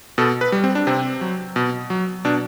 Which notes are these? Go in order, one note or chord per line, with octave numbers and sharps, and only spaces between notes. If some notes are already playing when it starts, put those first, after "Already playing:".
B2 A4
B4
G3
C4
D4
C3 C4
F#3
B2
F#3
B2 D4